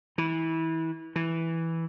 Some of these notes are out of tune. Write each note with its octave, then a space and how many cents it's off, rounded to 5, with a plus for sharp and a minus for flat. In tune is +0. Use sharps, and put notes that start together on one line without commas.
E3 -25
E3 -5